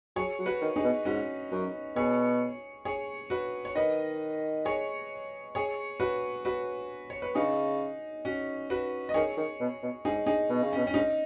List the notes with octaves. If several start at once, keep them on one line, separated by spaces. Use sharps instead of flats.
F#3 G#4 C#5
F#3
F#4 B4
D#3
D#4 G#4
B2
G#2 C#4 F#4
F#2
B2 G#4 C#5
G#4 C#5
F#4 B4
C#5
D#3 B4 D#5
G#4 C#5
G#4 C#5
F#4 B4
F#4 B4
C#5
B4
C#3 D#4 G#4
C#4 F#4
F#4 B4
D#5
D#3 G#4 C#5
D#3
B2
B2
G#2 D#4 G#4
D#4 G#4
B2
C#3
B2 C#4
C#4
G#2 D#4